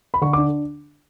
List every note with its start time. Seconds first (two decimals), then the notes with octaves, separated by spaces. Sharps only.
0.14 B5
0.22 D3 C#6
0.33 D4 D6